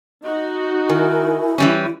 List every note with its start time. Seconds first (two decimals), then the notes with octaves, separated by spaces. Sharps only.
0.24 D#4 F#4 D#5
0.89 D#3 E4 A#4 G#5
1.58 E3 G3 C#4